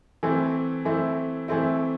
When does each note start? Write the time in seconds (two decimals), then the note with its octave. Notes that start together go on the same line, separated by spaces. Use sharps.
0.23 E3 A3 C4 E4
0.85 E3 A3 C4 E4
1.48 E3 A3 C4 E4